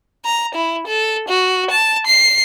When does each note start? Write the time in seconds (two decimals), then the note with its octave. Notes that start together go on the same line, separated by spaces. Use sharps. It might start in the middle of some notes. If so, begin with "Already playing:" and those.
0.25 A#5
0.55 E4
0.87 A4
1.28 F#4
1.70 A5
2.07 C7